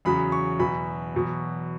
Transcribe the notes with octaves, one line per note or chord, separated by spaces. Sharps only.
E2 C#3 F#3 B5
C#6
E2 B2 F#3 B5
E2 B2 F#3